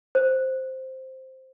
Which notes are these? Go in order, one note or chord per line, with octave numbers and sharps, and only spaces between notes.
C5